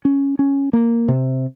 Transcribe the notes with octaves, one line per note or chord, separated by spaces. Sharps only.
C#4
C#4
A#3
C3